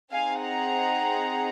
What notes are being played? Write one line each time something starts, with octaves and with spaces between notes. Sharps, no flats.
C4 D#4 G#4 F5 G#5
F#5 A#5